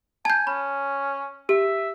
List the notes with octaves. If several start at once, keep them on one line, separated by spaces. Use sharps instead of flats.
G#5 A5 G6
C#4 B5
G4 E5